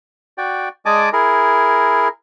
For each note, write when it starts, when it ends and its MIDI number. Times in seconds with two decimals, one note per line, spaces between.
0.38 0.69 66
0.38 0.69 74
0.38 0.69 79
0.86 1.09 56
0.86 1.09 74
0.86 1.09 75
0.86 1.09 80
0.86 1.09 81
0.86 1.09 86
1.13 2.08 64
1.13 2.08 68
1.13 2.08 70